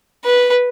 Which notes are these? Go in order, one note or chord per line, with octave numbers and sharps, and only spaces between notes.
B4